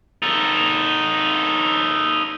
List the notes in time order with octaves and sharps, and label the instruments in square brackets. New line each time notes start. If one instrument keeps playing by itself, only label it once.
[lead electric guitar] D#4 A4